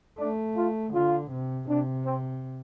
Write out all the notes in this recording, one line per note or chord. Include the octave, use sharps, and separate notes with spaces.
A3 D4
F4
D3 F4
C3
C3 D4
C4